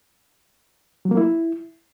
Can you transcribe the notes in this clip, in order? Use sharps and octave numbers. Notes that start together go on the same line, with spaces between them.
F#3
A#3
E4